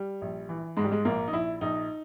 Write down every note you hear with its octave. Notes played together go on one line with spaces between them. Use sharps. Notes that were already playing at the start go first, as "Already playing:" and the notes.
Already playing: G3
A#1
E3
G#2 G#3
G3
G#3
A#1 A#3
D#4
A#1 E4
A#1 D#4